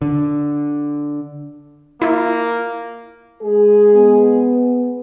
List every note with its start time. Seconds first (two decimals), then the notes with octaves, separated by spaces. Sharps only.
0.02 D3
2.02 A#3 E4 F4
3.43 G#3 G#4
3.95 B3